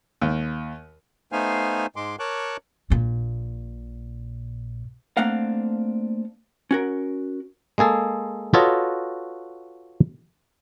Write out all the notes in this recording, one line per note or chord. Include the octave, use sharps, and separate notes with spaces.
D#2
A3 B3 D#4 C5 F5 G#5
G#2 G#3 C6 D6
A#4 C#5 A5 C#6 D6 F#6
A#1 A#2
A3 A#3 C4 D4 F5 F#5
C#4 F#4 A#4
G#3 A#3 G#4 A4
F4 F#4 A4 B4 C#5 D#5